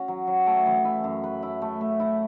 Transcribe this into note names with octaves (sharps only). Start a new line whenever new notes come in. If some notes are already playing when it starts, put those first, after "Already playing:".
Already playing: C#4 F#4
F#3
F#3
A3
E3
E4
F#2
B4
E4
A3
A3
E4